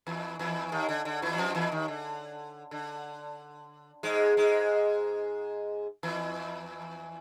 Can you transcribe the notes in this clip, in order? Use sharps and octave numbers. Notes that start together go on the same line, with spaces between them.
E2 E3
E2 E3
D#2 D#3
D3
D3
E2 E3
F#3
F2 F3
E2 E3
D#2 D#3
D3
D3
G#2 G#3
G#2 G#3
E2 E3